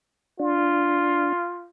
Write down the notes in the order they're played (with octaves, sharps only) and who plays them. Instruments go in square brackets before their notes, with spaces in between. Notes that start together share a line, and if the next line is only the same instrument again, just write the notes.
[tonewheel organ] D4 [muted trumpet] F4